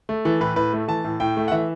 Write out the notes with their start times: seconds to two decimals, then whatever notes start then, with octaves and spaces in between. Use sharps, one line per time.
0.09 A3
0.25 E3 A4
0.41 A2 B4
0.56 A2 B4
0.73 A3
0.88 E3 A5
1.04 A2
1.20 A2 G5
1.37 A3
1.48 F#5
1.52 E3 E5